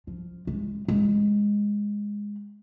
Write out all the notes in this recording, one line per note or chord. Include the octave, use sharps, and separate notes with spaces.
F3
G#3
G#3